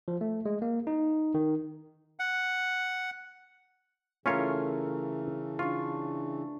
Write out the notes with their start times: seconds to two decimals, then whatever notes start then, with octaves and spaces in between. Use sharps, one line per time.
0.08 F3
0.21 A3
0.45 G#3
0.62 A#3
0.87 D#4
1.34 D#3
2.19 F#5
4.26 C#3 E3 A3 C#4 F4 A#4 C#5 F5
5.59 D4 F4 C#6